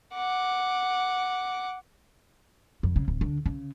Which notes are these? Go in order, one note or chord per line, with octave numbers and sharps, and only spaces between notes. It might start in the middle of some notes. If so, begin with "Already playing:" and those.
F#5 D6
F2
C#3
D1
D3
C#3